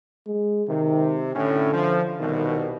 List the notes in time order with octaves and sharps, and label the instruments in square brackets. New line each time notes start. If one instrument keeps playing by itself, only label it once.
[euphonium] G#3
[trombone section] C3 [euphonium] D#3
[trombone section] A2 C#4 [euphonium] D3
[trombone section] F3
[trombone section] C2 B2 [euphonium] D#3